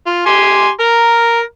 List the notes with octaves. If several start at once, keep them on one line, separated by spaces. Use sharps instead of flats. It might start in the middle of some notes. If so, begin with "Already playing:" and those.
F4
G4 G#5 C6
A#4 A#5